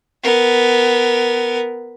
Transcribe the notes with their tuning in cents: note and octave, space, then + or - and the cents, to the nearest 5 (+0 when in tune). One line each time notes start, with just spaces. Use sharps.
B3 +5 A#4 +0